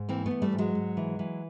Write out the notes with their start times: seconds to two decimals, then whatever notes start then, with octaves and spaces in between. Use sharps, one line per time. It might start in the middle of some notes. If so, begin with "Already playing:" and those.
Already playing: G#2
0.09 E3 A#3 C4
0.26 A3 B3
0.31 E3
0.42 G3 A3
0.52 G#2
0.58 F#3 G#3
0.75 G#2
0.97 E3
1.19 E3